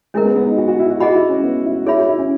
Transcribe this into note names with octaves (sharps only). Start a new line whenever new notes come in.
G#3 C#4 E4 A#4
B3
B3
D#4
F#4
F#4
E4
F#4
F#4 G#4 D#5 F#5 B5
E4
C#4
B3
E4
E4 G#4 C#5 E5 B5
F#4
E4
C#4